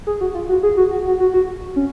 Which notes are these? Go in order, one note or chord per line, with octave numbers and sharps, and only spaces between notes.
G#4
F#4
F4
F#4
G#4
F#4
F#4
F#4
F#4
F#4
C#4